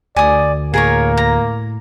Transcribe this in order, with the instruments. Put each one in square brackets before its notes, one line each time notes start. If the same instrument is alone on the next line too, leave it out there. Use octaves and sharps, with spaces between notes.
[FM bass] D2 [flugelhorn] D5 [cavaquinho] G#5 D#6
[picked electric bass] A2 [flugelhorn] A#3 [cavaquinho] G#4 A#4 C#5
[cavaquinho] A#5